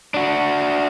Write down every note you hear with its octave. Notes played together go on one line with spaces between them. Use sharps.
D4 F#4